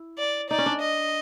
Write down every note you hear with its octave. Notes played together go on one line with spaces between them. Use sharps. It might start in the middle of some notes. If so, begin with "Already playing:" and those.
Already playing: E4
D5
D#4 D5
C#4
D4
D#5